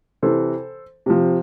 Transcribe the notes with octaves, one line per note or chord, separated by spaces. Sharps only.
C3 E3 A4 C5
C3 F3